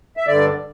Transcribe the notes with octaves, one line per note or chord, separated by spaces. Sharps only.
E5
G2 D3 D5